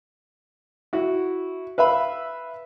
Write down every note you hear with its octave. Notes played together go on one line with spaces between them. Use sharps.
E4 F#4
B4 E5 F5 B5